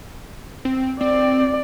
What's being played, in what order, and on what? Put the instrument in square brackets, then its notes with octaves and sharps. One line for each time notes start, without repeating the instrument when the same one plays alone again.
[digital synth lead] C4
[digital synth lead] C4 [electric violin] D5